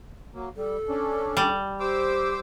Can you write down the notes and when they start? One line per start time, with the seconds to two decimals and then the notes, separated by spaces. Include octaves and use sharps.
0.35 F#3 A#3
0.57 G3 A4
0.89 C#4 D4
1.37 G3
1.80 G4 C5 D6 E6